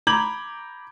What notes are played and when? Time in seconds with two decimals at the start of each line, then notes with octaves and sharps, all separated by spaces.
0.07 A#5 B5 D6 G6 G#6 F#7